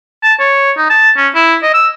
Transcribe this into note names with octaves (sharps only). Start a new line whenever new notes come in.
A5
C#5
D#4
A5
C#4
E4
D#5
E6